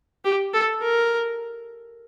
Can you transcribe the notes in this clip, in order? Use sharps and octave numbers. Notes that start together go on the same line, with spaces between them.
G4
A4
A#4